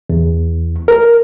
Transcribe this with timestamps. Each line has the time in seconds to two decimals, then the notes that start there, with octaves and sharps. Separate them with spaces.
0.10 E2
0.88 A#4